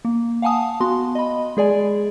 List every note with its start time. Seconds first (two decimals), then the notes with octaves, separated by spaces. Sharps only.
0.05 A#3
0.42 F5 F#5 G#5 A5 D#6
0.80 B3 F#4 C6
1.15 D#5 B5
1.57 G#3 G#4 D5 G#5